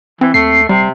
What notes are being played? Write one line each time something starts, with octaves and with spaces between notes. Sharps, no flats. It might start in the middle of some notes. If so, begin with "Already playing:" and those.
E3 C4
D#2 A3 C7
D#1 C3 G3